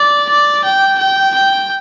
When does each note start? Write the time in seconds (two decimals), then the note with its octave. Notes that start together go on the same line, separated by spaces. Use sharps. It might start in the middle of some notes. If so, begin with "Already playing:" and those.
Already playing: D5
0.29 D5
0.64 G5
0.99 G5
1.34 G5